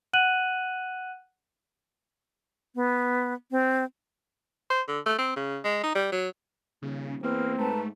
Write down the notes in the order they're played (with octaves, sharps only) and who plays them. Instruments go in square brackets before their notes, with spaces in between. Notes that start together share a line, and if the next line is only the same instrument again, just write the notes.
[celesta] F#5 F#6 D#7 F#7
[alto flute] B3
C4
[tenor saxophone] C5
D3
A3
C4
C#3
G#3
D#4
G3
F#3
[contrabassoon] D#1 [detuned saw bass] C#3
[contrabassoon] E2 [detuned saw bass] A#3 [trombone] C4 [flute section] B4 F6
[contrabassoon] G#2 [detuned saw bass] A3 [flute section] B4 A5 A#5